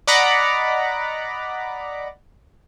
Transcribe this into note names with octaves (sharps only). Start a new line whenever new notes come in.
D5 D#5 F#5 A#5 B5 D6